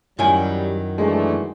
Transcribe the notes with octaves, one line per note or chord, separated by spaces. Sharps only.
F#2 D#3 F#3 G3 E4 G#5
E3 G#3 A3 D4